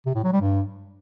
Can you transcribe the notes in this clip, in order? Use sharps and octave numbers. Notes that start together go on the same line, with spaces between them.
C3
A2
F#3
G3
G2